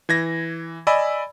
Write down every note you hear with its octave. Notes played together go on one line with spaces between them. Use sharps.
E3 G#6 A#6
D5 D#5 G#5 B5 E6